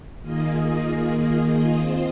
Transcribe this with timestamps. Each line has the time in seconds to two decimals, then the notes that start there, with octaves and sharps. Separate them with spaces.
0.21 D#3 A#3 F4 G#4 D#5
1.76 C4 F4 C5 D#5